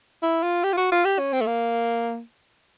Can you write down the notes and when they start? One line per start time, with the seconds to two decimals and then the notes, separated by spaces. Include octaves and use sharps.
0.23 E4
0.43 F4
0.64 G4
0.73 F4
0.77 F#4
0.92 F4
1.05 G4
1.19 C#4
1.33 C4
1.41 A3
1.46 A#3